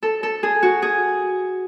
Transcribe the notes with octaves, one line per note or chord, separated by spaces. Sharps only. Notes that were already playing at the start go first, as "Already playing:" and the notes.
A4
A4
G#4
F#4
G#4